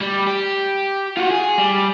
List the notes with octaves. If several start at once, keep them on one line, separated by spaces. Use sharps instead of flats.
G3
G4
F4 F#4
G#4
G3